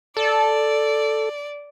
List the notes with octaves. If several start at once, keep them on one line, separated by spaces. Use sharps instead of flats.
A4 D5